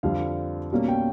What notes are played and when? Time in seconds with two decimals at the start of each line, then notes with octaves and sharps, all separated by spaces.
0.03 F2 D3 G3 F5
0.72 B2 G3 A#3 C#4
0.88 G5